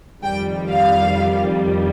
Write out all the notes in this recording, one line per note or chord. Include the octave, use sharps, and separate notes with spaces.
F2 D#3 G3 G5
F5